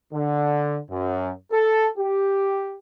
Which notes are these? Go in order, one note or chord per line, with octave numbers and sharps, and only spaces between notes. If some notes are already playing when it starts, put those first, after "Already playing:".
D3
F#2
A4
G4